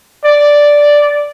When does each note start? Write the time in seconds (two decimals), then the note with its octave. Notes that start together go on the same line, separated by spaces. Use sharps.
0.25 D5